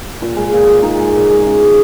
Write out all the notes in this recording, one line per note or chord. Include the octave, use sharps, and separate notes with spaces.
A#2 F4
G#3
A#2
G#3
A#2 D#4
G#3
A#2
G#3
C#3
F3 G#3